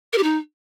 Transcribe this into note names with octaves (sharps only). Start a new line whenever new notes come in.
A#4
G4
D#4